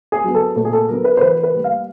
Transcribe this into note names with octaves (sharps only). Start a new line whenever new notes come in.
G#4
F#3 B3
A4
A#2 A4
G#4
A4
F#3 B3 A#4
B4
C5
E3 B4
B4
G3 A#3
F5